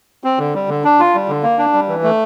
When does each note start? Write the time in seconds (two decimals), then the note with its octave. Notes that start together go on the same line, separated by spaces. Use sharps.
0.24 C4
0.39 D3
0.55 G3
0.69 D3
0.84 D4
1.00 F4
1.15 G3
1.28 D3
1.43 A#3
1.58 D4
1.73 G3
1.88 E3
2.03 A3